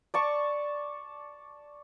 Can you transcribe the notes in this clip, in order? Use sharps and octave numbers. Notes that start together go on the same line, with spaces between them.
D5 A5 C#6